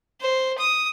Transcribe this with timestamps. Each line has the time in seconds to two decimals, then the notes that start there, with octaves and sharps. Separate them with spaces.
0.21 C5
0.58 D#6